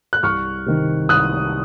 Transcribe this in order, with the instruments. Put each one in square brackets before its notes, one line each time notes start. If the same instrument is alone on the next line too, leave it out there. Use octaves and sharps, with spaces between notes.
[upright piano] F#6
C2 C#6 F6
C3 D#3
C2 D#6 F#6